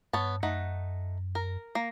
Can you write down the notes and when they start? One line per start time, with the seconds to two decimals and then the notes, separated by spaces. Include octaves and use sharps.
0.13 G2 B3 C#5 A5
0.43 F#2 A3 D#4 F#5
1.35 A#4
1.75 A#3